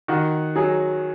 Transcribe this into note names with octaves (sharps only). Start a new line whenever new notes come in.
D#3 F#4
F#3 G#4